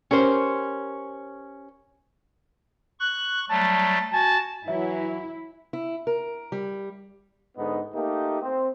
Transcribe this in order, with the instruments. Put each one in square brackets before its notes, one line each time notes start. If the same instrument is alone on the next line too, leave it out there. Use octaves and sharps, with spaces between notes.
[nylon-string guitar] C#4 G4 A#4 C5
[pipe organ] C#6 [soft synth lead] F#6
[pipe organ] F#3 G3 A3 [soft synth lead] A5
[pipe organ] F#4 [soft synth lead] G#5 [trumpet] A5
[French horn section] E3 F#3 [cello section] E4 [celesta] E5
[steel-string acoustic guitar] E4
A#4
G3
[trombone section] G#2 D3 B3 D#4
A3 A#3 D#4 G4
C4